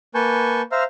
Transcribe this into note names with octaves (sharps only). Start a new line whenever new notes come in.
A#3 B4 G#5 A5 C#6 G6
C5 E5 F5 A#5 F6